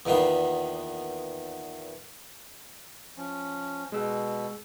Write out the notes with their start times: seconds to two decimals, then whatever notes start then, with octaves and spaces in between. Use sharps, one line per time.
0.06 E2 A#2 D#3 B3 F5
3.17 F3 C#4
3.92 B2 G#3 E6